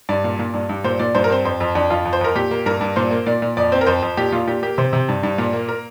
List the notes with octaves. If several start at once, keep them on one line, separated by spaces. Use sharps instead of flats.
G2 D5
A#2
A#2
G2
G2
A#2 C5
A#2 D5
G2 C5
A#4
C4 C5
F2 C5
F2
F2 D4
F2 F4
F2
C5
F2 A#4
A#2 G4
A#3
G2 A#4
G2
A#2 C5
A#3
A#2 D5
A#2
F2 D5
C4 C5
A#4
F2 C5
F2
A#2 G4
A#2 F4
A#2 G4
A#3 G4
C3 C5
C3
G2
G2
A#2
A#3
A#4